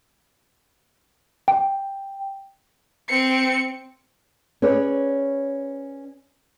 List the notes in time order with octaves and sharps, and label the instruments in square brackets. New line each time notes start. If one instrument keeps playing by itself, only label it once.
[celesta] G5
[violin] C4 C#7
[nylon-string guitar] C#4 G#4 B4 C#5 D5